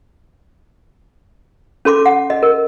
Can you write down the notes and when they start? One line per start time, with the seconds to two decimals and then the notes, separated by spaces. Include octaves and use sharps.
1.85 C#4 A4 C6 D6
2.06 F#5
2.30 D#5
2.43 A#4